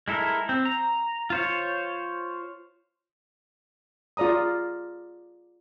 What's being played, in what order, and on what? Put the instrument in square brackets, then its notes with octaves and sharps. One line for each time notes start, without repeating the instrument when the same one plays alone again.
[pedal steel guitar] G#3 E4 A4 A#4
C4
A#5
F4 C5 C#5
[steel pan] F4 G#4 D5 A#5 D#6